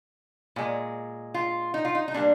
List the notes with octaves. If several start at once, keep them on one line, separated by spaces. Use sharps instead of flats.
A#2 G#3
F4
D#4
F4
D#4
D#4
A#2 G3 A#3 D4